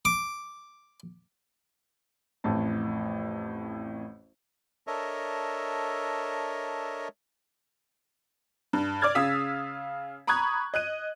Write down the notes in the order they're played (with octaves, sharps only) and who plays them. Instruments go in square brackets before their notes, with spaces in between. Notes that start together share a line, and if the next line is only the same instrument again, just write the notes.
[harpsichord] D6
[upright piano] A1 F2 A2 A5
[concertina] D4 A4 A#4 C#5 D#5 E5
[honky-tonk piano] G2
D5 D6 F6 G#6 A6
C#3 F5 D#6 E6 B6
A#5 B5 C#6 D#6 F#6 G#6
D#5 F#6 D#7